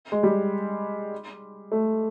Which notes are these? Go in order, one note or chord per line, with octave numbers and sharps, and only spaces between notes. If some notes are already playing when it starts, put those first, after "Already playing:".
G#3
G3
A3